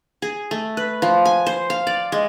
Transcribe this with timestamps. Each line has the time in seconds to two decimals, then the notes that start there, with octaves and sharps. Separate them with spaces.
0.22 G#4
0.51 A3
0.77 B4
1.02 F3
1.25 G#5
1.46 C5
1.70 F5
1.87 D5
2.12 G#3